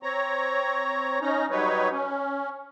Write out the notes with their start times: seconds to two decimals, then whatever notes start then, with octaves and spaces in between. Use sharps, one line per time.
0.03 C4 C#5 A#5
1.21 C#4 D#4 A#5
1.50 F#3 G3 D#4 B4 C#5
1.92 C#4